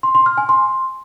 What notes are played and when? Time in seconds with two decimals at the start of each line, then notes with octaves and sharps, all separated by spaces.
0.03 C6
0.15 C6
0.26 F6
0.38 G#5
0.49 C6